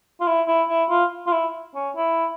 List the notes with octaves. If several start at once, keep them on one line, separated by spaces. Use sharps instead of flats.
F4
E4
E4
E4
F4
F4
E4
C#4
E4